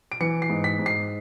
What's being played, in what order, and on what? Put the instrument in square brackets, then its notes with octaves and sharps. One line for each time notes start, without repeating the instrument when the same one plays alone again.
[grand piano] D7
E3 C#7
C7
G#2
B6
G#2
C7